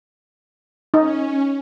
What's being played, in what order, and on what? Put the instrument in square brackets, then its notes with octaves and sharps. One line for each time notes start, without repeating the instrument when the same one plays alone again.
[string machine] C#4 [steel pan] D#4